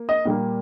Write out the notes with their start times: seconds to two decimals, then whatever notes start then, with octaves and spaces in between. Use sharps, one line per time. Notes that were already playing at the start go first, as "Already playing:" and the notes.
Already playing: A#3
0.09 D#5
0.25 A#2 G3 A#3